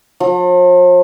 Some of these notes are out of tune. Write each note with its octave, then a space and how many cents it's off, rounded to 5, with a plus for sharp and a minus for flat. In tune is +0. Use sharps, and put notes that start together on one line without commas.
F3 +45